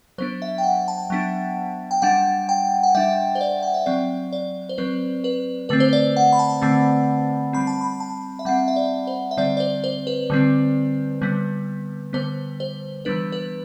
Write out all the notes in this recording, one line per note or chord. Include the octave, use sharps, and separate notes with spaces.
F#3 B3 D4 C5
E5
G5
F#5
A5
F#3 B3 D4
G5
G3 D4 F#5
G5
F#5
G3 D4 E5
C5
D5
F#5
E5
F#3 C4 D5
D5
C5
F#3 C4 B4
B4
D3 A3 C4 B4
C5
D5
F#5
B5
A5
D3 A3 C4
G3 C4 B5
A5
B5
A5
E5
G3 C4 F#5
E5
D5
C5
E5
D3 G3 C4 D5
D5
C5
C5
B4
D3 G3 C4
D3 G3 B3
D3 G3 B3 C5
C5
E3 G3 B3 D4 B4
B4